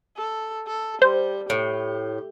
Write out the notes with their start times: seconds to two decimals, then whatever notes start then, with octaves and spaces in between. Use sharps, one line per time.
0.17 A4
0.67 A4
1.02 G3 C5
1.50 A2 G4